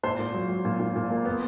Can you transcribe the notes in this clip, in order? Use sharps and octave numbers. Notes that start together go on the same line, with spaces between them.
A#2 C5
A#2
F#3
F#3
A#2
A#2
A#2
A#3
B3